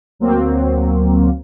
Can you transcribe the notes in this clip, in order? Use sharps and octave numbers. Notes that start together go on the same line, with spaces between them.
D2 F#3 A#3 C4